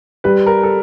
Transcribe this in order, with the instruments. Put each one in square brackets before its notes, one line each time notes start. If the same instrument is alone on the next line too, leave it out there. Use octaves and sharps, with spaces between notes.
[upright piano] G3 [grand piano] B4
[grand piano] A#4
A4